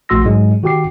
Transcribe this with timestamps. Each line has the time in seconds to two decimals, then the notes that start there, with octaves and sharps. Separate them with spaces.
0.09 A#1 A3 F#4 C6 E6 A#6
0.25 G#2 F#3 G#3
0.63 D#3 F#4 G4 G5 D6 C7